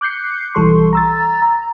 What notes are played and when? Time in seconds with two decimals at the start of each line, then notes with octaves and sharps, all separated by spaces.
0.01 D6 F#6 G6 C7 C#7
0.55 B1 E3 G3 A4 C6 C#6
0.93 A#5 E6 A6
1.42 A#5